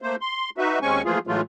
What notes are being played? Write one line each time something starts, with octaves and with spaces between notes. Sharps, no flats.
A3 A#3 C5
C6
D#4 F#4 B4 E5
D#2 G#3 C4 C#4 G#5 C#6
E3 F3 A3 A#3 F4 G#4
A2 E3 F#3 G#3 A3 F4